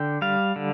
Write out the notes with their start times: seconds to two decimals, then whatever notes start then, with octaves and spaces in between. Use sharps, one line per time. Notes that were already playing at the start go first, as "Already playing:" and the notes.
Already playing: D3 G5
0.22 G3 F5
0.56 D3